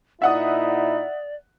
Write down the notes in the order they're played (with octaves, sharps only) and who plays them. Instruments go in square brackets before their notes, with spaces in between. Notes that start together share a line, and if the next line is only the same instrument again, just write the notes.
[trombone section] A#2 D#4 E4 [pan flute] D5 [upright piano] E5 F#5 D#6